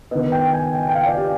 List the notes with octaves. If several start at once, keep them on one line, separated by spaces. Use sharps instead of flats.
D#3 B3 D#5
G5
G#5
G5
G5
F5
D5
G4